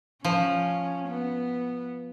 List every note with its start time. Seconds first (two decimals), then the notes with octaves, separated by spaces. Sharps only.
0.25 F3 C#4
1.08 B3